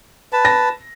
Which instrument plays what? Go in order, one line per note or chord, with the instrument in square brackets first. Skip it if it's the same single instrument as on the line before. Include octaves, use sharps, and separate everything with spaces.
[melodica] B4 A5
[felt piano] A#6